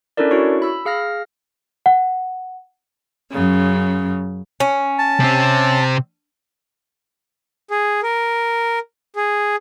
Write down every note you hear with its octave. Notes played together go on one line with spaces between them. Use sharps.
C#4 D4 E4 A4 A#4 D5
E4 F#4 C#5 C#6
B5 E6
G#4 F5 F6 A#6
F#5
F#2 C#3
C#4
A5
C3 C4
G#4
A#4
G#4